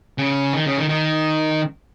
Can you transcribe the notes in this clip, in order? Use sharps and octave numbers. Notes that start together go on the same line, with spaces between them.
C#3
D#3
C#3
D#3
D#3